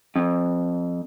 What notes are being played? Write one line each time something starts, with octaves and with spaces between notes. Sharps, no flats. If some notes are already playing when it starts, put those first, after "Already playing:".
F2